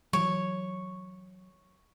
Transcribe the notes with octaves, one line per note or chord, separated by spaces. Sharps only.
E3 F#3 C#5